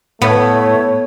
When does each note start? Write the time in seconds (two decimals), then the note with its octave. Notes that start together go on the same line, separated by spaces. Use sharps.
0.22 A2 A3 B3 C#5